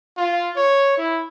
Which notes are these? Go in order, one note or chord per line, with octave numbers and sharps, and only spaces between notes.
F4
C#5
E4